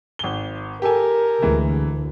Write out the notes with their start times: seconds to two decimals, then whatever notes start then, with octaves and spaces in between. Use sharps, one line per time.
0.19 G#1 G7
0.82 G4 A4 A#4 G#5
1.42 D2 E3 G#3